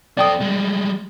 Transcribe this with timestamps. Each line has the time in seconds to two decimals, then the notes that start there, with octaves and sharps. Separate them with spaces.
0.17 C4 A4 D5 G5 D#6
0.40 G3 G#3